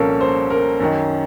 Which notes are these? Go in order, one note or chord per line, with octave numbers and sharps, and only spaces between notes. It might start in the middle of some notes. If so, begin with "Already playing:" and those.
Already playing: C2 A#2 F3 C#4 A4 A#4
C5
A#4
F#2 D#3